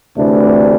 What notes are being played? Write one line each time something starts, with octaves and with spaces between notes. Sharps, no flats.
D2 C3 E3 A3 D4